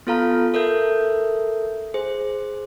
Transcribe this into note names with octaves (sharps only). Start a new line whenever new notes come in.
B3 F4 A4 F5 A#5 F6
A4 A#4 E5 G6
G#4 C5